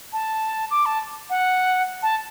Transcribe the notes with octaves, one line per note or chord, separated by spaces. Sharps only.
A5
D6
A5
F#5
A5